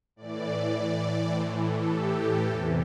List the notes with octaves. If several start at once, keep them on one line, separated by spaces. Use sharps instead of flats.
A2 E3 D5
A2 E3 C5
A4
G4
E2 C3 E3 A4